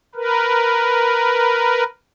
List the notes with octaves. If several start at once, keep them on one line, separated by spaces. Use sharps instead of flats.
A#4 B4